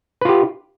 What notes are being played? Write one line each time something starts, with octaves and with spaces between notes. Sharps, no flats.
F4 G4 B4